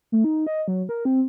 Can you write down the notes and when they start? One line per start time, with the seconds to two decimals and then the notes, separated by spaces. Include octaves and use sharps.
0.12 A3
0.24 D#4
0.47 D#5
0.68 F#3
0.89 A#4
1.05 C4